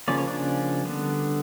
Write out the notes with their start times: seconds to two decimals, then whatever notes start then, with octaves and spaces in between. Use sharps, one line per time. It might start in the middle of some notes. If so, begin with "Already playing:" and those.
0.08 C#3 F3 A#3 C#4 D5
0.18 C#5
0.27 D4 D5
0.85 D3 G3 B3